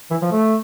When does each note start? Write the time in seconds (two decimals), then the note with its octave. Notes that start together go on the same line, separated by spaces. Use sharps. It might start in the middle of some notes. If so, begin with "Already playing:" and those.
0.11 E3
0.22 F3
0.31 A3